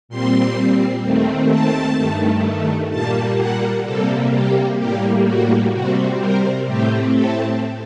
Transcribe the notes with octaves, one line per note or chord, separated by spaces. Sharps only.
A#2 G3 C4 C6
D#2 D#3 A3 C4
A5
G2 D#3 A3
A#2 G3 A#3 A5
F#5
C3 G3 A#3 A4
G4
A2 G3 A#3 G4
F#4
C3 G3 C4 F#4
A#4
A2 A3 C4 G4
A4